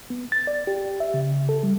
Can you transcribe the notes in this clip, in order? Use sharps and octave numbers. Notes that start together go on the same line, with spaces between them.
B3
A6
D5
G4
E5
C#3
A4
G3